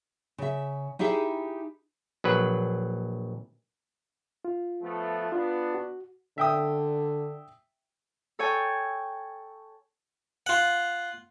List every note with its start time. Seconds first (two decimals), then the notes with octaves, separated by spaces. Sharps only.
0.38 C#3 E5
0.99 D#4 E4 G4 G#4 E5
2.24 A#1 F#3 B4
4.45 F4
4.82 F3 A3 B3
5.32 B3 D4 F4
5.74 F#4
6.38 D3 E5 G5 D#6
8.39 A4 C#5 G5 G#5
10.46 F4 F#5